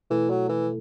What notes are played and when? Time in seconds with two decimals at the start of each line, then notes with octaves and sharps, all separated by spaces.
0.10 B2 E3 A3 E4 A4
0.30 F#3
0.49 E3